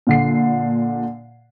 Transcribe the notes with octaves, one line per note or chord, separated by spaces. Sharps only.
A#2 D3 C7